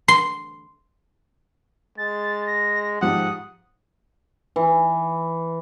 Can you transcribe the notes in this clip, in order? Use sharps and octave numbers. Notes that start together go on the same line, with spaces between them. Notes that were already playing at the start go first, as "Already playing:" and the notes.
C6
G#3 A6
A#6
G#2 F3 G4 F#5 D#6
E3